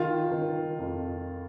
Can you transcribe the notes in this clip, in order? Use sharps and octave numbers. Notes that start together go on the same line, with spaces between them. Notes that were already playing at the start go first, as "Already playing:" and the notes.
Already playing: D#3 F4
D#3
F2